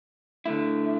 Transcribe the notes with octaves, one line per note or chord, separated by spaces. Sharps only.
D3 A3 E4